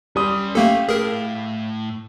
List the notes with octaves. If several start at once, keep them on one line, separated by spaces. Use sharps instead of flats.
G3 C#4 C6 D#6
A3 A#3 G4 A4 F5
A2 G#4 A#4